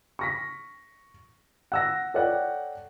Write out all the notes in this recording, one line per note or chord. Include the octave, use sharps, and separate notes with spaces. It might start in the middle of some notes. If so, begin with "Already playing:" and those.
C#6 A#6 B6
F#5 E6 A#6
A4 C#5 D5 F#5 G5